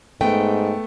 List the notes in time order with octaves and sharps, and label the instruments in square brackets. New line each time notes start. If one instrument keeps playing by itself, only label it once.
[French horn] G#2 [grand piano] A3 B3 [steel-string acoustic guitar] G5